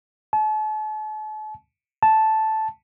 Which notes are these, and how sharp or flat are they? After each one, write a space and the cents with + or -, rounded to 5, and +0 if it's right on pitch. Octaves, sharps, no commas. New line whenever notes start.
A5 -40
A5 -5